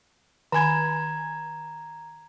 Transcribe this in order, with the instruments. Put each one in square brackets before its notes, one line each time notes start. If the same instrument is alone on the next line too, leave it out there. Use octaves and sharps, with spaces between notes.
[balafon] D#3 G#5 B5 [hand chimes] A#5 G#6